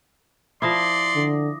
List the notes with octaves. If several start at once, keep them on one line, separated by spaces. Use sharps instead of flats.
F3 E4 D5 C6 D6 D#6 A#6
D3